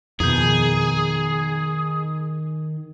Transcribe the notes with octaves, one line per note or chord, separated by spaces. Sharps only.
F2 B2 D#3 G#4 G6